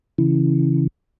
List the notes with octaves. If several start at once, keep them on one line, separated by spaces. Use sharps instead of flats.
C#3 E3